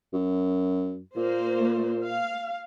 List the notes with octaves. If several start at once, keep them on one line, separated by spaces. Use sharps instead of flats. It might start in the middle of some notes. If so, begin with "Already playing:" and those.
F#2
A#2 A#3 C5
F5